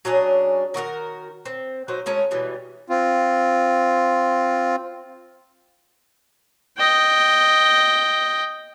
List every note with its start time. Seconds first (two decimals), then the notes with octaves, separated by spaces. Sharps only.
0.05 F#3 C#4 D4 G#4
0.74 D#3 F#4 A4 A#4
1.46 C4
1.88 F#3 D#4 C5
2.06 G#3 A3 C#4 A#4
2.31 B2 E3 G3
2.90 C4 F4
6.78 D#5 G5